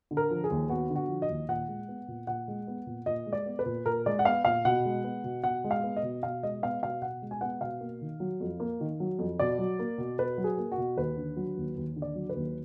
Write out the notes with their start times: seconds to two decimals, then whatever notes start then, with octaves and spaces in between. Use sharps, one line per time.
0.11 D3
0.17 A#4
0.30 F3
0.44 G#4
0.50 D#2
0.69 B3 F#4
0.90 D3
0.96 F#4
1.09 F3
1.22 D#5
1.30 D#2
1.49 A#2 F#5
1.68 G#3
1.88 B3
2.08 A#2
2.27 A#2 F#5
2.48 G#3
2.67 B3
2.86 A#2
3.06 A#2 D#5
3.26 G#3
3.33 D5
3.46 B3
3.59 B4
3.66 A#2
3.85 A#2 A#4
4.06 G#3 D5
4.19 F#5
4.25 B3 F5
4.45 A#2 F5
4.65 B2 F#5
4.85 G#3
5.04 B3
5.24 B2
5.43 B2 F#5
5.64 G#3
5.71 F5
5.83 B3
5.96 D#5
6.03 B2
6.23 B2 F5
6.43 G#3 D#5
6.62 B3 F5
6.82 B2 F5
7.02 B2 F#5
7.22 G#3
7.31 G#5
7.41 B3 F#5
7.61 B2 F5
7.81 A#3
8.01 D#3
8.20 F#3
8.40 F2
8.60 A#3
8.81 D#3
9.00 F#3
9.19 F2
9.39 B2 D5
9.59 F#3
9.79 A#3
9.98 B2
10.19 B2 B4
10.38 F#3
10.44 G#4
10.58 A#3
10.72 F#4
10.77 B2
10.97 D#2 B4
11.17 D3
11.36 F#3
11.57 D#2
11.76 D#2
11.96 D3
12.02 D5
12.15 F#3
12.29 B4
12.35 D#2